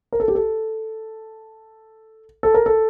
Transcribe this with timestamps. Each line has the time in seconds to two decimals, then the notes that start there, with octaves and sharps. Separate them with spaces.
0.12 A#4
0.20 A4
0.28 G4
0.35 A4
2.43 A4
2.54 A#4
2.66 A4